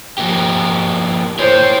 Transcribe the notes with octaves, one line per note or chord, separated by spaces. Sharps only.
F3 A#3 G4
E4 C5 C#5